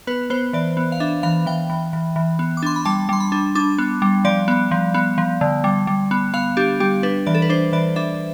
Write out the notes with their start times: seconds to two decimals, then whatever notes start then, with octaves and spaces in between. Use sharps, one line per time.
0.07 B3 B4
0.30 B3 C5
0.53 E3 D5
0.77 B3
0.92 F5
1.00 D4 E5
1.23 E3 F5
1.46 E3 G5
1.70 E3
1.93 E3
2.16 E3
2.39 B3
2.57 D6
2.63 D4 C6
2.76 B5
2.85 G3 A5
3.09 G3 C6
3.20 B5
3.32 D4
3.55 D4 D6
3.78 B3
4.02 G3
4.25 F3 D5
4.48 B3
4.71 F3
4.94 B3
5.18 F3
5.41 D3
5.64 G3
5.87 G3
6.11 B3
6.34 B3 F5
6.57 D4 G4
6.80 G3 G4
7.03 D4 B4
7.26 E3 D5
7.34 A4
7.42 B4
7.49 D4 C5
7.73 E3 D5
7.96 D4 E5